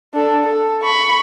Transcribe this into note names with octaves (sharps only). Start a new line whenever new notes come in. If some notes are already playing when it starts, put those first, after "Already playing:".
D4 A4
A4
B5 C#6